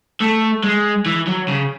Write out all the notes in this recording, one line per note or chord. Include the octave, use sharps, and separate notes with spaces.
A3
G#3
E3
F#3
C#3